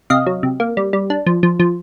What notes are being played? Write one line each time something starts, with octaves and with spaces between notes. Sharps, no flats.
C3 D#5 F5
F#3
C3
A#3
G3
G3
D4
F3
F3
F3